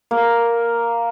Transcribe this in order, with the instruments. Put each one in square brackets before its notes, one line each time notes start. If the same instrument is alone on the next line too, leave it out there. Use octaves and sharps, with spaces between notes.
[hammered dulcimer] A#3